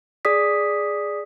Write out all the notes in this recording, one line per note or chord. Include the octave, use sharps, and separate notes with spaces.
G#4 D5 D#6 B6